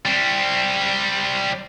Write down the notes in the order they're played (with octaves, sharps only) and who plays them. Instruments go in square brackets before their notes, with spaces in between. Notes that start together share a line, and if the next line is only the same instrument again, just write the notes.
[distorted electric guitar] G3 C4